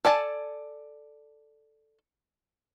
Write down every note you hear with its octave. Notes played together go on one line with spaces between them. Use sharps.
A4 D5 G#5 A5